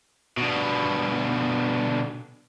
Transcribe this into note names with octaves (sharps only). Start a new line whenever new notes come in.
B2 D3